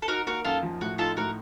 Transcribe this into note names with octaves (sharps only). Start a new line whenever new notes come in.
A4
D#4 F#4 A#4
A#3 F#4 A#4
F#2 F4 A4
F3
A2 F#4
D#4 F4 A4
A2 F#4 A#4